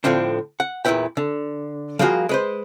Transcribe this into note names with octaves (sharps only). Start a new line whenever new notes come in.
A2 D3 F3 C4 D4
F#5
E2 A#2 C#4 E4 B4 G5
D3
F3 G3 A#3 F4 F#4 G#4
G#3 B4 C5